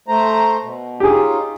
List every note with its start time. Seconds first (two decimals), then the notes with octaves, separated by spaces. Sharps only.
0.08 A3 C5 A#5
0.63 B2
1.00 C#4 D#4 F4 G4 G#4